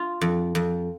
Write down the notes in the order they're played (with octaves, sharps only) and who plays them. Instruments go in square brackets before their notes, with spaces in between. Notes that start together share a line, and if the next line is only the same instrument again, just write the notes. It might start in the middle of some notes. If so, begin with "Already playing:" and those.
Already playing: [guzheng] F4
F2
F2